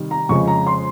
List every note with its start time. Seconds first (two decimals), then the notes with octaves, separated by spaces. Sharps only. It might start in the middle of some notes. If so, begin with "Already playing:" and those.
Already playing: C3 D#3 G3
0.11 A#5
0.29 F2 C#3 G#3 C#6
0.47 A#5
0.67 C6